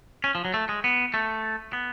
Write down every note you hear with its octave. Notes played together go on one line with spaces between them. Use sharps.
C#4
F3
F#3
A3
G#3
B3
A3
B3